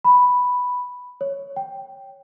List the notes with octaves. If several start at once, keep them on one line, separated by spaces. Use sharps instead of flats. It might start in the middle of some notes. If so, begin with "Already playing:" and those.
B5
C#5
G5